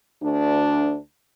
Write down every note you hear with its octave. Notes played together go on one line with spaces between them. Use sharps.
D2 D4